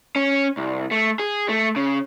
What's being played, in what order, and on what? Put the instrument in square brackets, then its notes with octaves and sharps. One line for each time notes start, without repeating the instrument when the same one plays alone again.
[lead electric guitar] C#4
C2
A3
G#4
A3
C#3